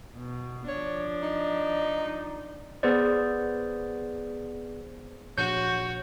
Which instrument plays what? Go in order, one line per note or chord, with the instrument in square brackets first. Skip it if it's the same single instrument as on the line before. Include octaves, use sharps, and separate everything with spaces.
[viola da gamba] B2
[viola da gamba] F3 D4 [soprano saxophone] C#5
[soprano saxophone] D#4
[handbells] B3 G#4 B4 C5 D5
[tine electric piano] A#1 [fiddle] F#4 [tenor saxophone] C#5 [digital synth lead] G6